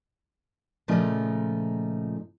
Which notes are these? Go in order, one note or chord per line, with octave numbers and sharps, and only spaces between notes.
A#2 C#3 F3 A3 D#4